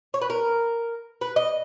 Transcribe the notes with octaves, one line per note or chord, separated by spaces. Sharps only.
C#5
B4
A#4
B4
D#5